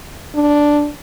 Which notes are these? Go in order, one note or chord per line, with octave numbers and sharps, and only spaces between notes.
D4